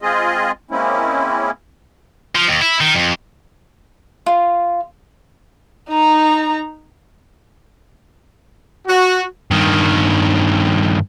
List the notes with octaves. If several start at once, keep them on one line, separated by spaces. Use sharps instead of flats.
G#3 C4 F4 G#4 D#5
G#3 A#3 C4 C#4 E4
F3
D#2
E4
D#3
F2
F4
D#4 A#5
F#4
G2 D#3